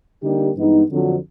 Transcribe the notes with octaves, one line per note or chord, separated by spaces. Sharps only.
D3 G3 A#3 D#4 G4
G2 E3 G#3 B3 D#4
F2 D3 F#3